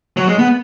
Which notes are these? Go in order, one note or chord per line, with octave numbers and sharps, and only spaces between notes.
F#3
G#3
B3